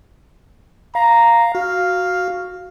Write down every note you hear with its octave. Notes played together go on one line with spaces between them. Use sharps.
F5 A#5
F#4 F5